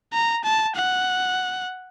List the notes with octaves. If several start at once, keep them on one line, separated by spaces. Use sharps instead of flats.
A#5
A5
F#5